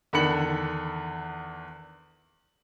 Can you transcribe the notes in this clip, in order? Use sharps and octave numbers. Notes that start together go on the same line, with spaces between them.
E2 D3 D#3 B5 C#7 F#7